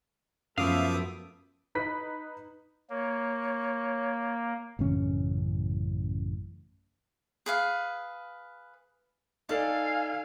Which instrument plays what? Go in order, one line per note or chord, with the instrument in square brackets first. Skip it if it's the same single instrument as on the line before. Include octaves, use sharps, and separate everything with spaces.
[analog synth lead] F#2 [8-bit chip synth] F3 D6 D#6 [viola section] A3 B3 E5 [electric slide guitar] F5
[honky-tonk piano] D#4 B4 B6
[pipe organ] A#3 [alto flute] C#5
[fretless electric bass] A1 F#2 C#3 C#4
[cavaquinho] G#4 B4 F5
[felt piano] D#4 A4 D5 [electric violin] F5 G#5 [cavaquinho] A5